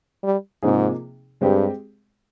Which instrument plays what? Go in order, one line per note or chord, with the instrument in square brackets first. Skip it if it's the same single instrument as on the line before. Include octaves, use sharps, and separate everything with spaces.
[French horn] G3
[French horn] G#2 [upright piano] C3 F3 A#3 D#4 G#4
[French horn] G2 [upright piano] G#3 C4 G4